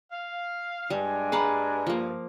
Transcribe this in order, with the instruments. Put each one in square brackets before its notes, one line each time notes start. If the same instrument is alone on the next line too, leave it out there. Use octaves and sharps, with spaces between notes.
[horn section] F5
[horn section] G2 [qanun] G3 [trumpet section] G#3 D4 G#5
[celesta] G#4 A#5 B5 [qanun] B4 F5 F#5
[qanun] F3 A#3